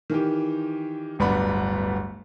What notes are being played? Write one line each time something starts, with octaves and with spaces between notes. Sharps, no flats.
D#3 E3 G4
D1 G1 B3 D4 B5